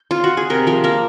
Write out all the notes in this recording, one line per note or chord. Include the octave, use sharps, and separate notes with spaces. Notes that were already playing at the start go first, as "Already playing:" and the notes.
Already playing: D#4
F4
F#4
G#4
C3 A#4
F3 A#4
A#3 A#4